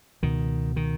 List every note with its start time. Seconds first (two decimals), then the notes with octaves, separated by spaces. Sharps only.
0.22 C#2 B2 D#3
0.76 D#3